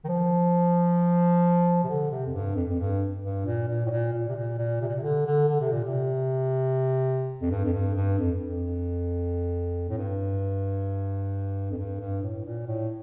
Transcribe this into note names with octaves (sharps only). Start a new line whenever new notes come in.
D#3
F3
C3
D3
C3
F2
G2
F2
F2
G2
G2
A#2
A#2
A2
A#2
A#2
C3
A#2
A#2
C3
A#2
C3
D3
D3
D3
C3
A#2
C3
F2
G2
F2
G2
G2
F2
F2
A2
G2
F2
G2
G2
A2
A#2
A2